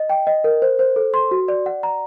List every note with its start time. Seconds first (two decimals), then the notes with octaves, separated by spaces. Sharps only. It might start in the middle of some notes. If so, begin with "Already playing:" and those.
Already playing: D#5
0.09 G5
0.27 D#5
0.44 A#4
0.62 C5
0.79 C5
0.96 A4
1.14 C6
1.31 F#4
1.48 D5
1.66 F#5
1.83 A#5